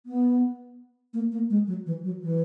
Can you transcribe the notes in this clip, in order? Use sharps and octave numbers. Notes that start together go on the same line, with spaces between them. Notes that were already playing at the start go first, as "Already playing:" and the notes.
B3
A#3
A#3
G#3
F#3
E3
F#3
E3